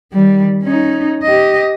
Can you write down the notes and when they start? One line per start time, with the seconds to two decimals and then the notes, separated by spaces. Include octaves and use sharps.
0.12 D#3 G3
0.63 C#4 D#4
1.23 G4 D#5